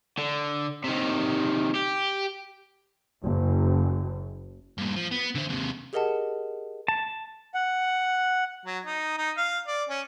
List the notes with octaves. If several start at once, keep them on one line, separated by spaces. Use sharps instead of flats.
D3
C3 D#3
G4
F#1
G2 A#2
F3
B3
D3 C5
D#2 C3
G4 G#4 A#4 D#5 F#5 A5
A5
F#5
F#3
D#4
D#4
F5
D5
C#4